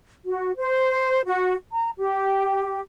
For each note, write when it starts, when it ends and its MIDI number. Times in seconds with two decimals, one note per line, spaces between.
0.24 0.52 66
0.57 1.20 72
1.26 1.54 66
1.71 1.89 82
1.98 2.80 67